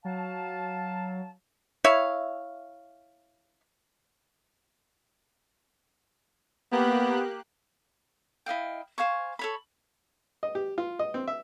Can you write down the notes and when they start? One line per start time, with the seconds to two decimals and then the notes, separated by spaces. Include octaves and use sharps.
0.05 F#3 F5 A5
1.84 E4 C#5 E5 F5
6.72 A#3 B3 G4 F#6
8.46 E4 D#5 F5 G5
8.98 C5 F5 G#5 C#6
9.39 A4 C#5 B5
10.43 D#5
10.55 G4
10.78 F4
10.99 D#5
11.14 C4
11.28 E5